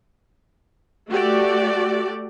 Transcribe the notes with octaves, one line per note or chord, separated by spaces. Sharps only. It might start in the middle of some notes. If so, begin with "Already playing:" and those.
A3 F#4 G4 A4 D5